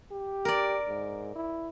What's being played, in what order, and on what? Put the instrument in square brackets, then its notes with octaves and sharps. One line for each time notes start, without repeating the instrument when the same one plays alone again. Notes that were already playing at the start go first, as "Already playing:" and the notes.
[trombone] G4
[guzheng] A#4 D5
[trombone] G#2
E4